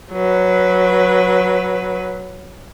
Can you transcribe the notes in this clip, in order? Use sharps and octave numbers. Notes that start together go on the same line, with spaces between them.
F#3 B4